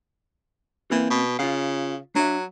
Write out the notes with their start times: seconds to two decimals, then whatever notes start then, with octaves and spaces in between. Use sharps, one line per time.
0.91 E3 A#3 C4 A#4
1.10 B2
1.39 C#3 F4 F5
2.16 F#3 D4 E5